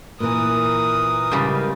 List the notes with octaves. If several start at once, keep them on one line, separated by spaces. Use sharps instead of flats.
A#2 E3 A#4 B4 D#6
G#2 C#3 G3